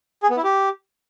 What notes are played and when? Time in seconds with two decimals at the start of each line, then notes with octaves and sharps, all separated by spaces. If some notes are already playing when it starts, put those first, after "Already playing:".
0.23 G#4
0.30 B3
0.37 E4
0.44 G4